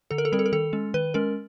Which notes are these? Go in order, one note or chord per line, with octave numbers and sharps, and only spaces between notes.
D3 A4
A#4
A4
G3 C4 A#4
A4
A#4
D#3 A4
G#3 C#4
D#3 B4
G#3 C#4 A#4